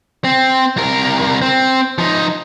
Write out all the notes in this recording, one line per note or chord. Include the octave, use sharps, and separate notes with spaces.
C4
C2 A#4
C4
F3 D#4